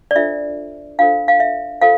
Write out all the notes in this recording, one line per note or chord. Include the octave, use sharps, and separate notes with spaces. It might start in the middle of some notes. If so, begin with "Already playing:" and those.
D5
D4 F4 A4 C5 E5
D4 F4 A4 C5 F5
F5
E5
F4 A4 C5 F5